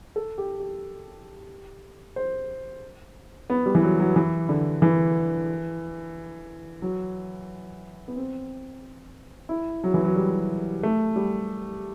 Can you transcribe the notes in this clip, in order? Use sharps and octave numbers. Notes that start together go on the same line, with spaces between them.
A4
G4
G4
C5
B3
G3
E3
F#3
F#3
E3
D3
E3
F#3
B3
C4
E4
F#3
E3
F#3
G3
A3
G3